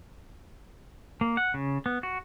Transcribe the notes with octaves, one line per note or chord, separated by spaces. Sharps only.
A#3
F#5
C#3
B3
F#4